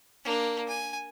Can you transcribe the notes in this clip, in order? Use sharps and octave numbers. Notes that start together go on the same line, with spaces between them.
A#3 D4
G#5